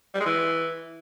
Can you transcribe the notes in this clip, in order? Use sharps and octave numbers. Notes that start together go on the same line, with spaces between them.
G3
G#3
E3